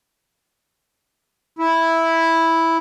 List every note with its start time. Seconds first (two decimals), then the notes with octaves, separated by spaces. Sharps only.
1.59 E4